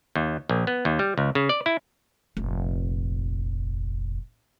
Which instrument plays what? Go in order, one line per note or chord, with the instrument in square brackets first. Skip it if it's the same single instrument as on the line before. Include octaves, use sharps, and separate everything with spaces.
[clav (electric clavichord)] D#2
A#1
B3
D#2
G3
C#2
C#3
D5
E4
[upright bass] F1 A#1